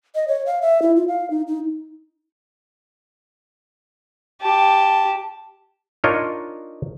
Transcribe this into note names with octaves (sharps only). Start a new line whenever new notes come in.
D#5
C#5
F5
E5
E4
F4
F5
D#4
D#4
G4 A5
D4 D#4 F4 A#4 C#5 D#5